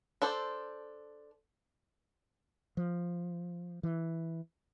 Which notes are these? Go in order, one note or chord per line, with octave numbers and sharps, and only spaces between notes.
D4 A4 C5
F3
E3